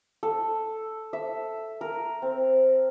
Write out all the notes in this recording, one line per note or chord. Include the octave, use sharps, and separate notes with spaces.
A4
E5
A#4
C4